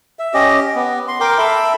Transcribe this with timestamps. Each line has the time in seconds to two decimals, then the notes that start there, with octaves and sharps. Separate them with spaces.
0.19 E5
0.34 C#4 G4 D#5
0.75 B3
1.08 C6
1.20 A#4 G5 C6 D6
1.38 A4 E5 B5